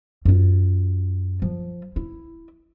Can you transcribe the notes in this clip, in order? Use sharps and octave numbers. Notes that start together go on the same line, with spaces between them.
F#2 F4
F3
E4